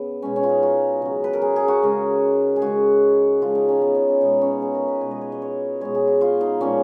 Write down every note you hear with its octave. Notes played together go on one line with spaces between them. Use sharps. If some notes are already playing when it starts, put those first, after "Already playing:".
Already playing: C#3 B3
B2 G#3 C#4
C#4
F4
D#4
F#4
C#3 F#3
B4
A#4
G#4
G#4
F#4
C#3 G#3
G#4
C#3 G#3 F#4
C#3 F3 G#3 F4
D#4
C#4
B3
C#4
C#4
B2 G#3 D#4
C#4
G#4
A#4
B4
B2 G#3 C#5
D#5
C#5
D#5
C#5
B2 G#3 C#5
G#4
F#4
F4
D#4
A#2 F3 G#3 C#4